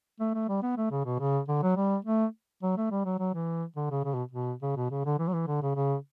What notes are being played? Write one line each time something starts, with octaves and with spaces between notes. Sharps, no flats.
A3
A3
G3
B3
A3
C#3
B2
C#3
D3
F#3
G3
A3
F#3
A3
G3
F#3
F#3
E3
D3
C#3
C#3
B2
B2
C#3
B2
C#3
D3
E3
F#3
E3
D3
C#3
C#3